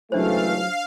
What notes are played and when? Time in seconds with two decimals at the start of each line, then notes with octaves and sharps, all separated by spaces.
0.12 C#2 E3 F#3 A3 D4 C5 F5